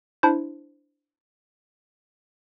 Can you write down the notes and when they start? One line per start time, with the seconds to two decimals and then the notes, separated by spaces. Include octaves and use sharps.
0.23 D4 E4 C5